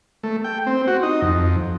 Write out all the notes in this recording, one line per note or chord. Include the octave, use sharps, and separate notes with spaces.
A3
G5
C4
F#4
D#4
F2